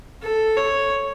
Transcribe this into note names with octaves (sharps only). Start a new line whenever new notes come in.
A4
C#5